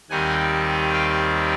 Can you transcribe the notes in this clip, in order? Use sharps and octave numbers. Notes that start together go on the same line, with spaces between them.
D#2 D#3 G3 C4 D#4 F#5 G#5
F5 G5